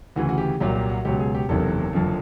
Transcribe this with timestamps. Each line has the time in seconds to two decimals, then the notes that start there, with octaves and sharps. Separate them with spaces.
0.16 D2 C#3 E3 F#4
0.29 F#4
0.38 G4
0.60 C2 A#2 F#3 G4
0.75 G4
0.90 F#4
1.05 C#2 B2 F#3 G4
1.19 G#4
1.35 G4
1.49 F#1 E2 C3 D#3 A4
1.93 F#1 F2 D3 F3